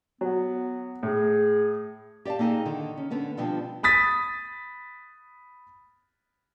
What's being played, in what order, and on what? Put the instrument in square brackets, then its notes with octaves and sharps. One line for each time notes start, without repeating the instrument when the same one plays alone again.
[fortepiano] F#3 [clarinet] B3
[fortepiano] A2 [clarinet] G#4
[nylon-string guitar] G4 D5 E5 F5 A5
A#3 C4 D#4 G#4
D3 D#3
C#4
D3 B3 C#4
B2 F3 G3 B3 C4 D4
[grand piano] B5 D#6 A6 B6